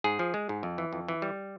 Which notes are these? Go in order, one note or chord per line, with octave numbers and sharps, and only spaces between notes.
G#2 G#4
F3
G#3
G#2
F2
E3
F2
E3
G3